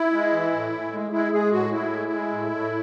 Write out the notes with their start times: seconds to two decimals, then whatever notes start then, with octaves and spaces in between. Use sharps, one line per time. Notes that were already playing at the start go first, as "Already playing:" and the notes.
Already playing: E4
0.12 G#3
0.32 E3
0.52 A2
0.72 A2
0.92 G#3
1.12 G#3 E4
1.32 G#3 G#4
1.52 A2 F#4
1.72 A2 E4
1.92 G#3
2.11 G#3
2.31 A2
2.51 A2